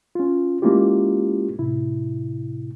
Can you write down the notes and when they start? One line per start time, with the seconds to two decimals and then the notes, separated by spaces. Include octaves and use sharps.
0.15 C#4 F4
0.62 G#3 A#3 C#4 E4 F4 G4
1.59 A2 C3 E4